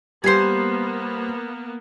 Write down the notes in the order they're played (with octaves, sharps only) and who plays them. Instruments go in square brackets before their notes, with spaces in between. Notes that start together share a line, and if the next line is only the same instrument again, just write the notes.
[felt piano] G3 C7 [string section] A#3 B3 [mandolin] C5 G#5